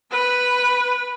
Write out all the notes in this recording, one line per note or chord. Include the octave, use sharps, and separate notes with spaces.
B4 B5